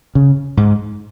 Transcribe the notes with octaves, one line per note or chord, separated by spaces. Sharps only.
C#3
G#2